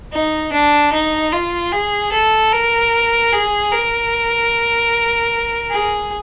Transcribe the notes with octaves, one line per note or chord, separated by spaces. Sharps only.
D#4
D4
D#4
F4
G#4
A4
A#4
G#4
A#4
G#4